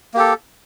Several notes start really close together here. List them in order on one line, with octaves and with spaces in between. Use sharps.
A#3 G4 A4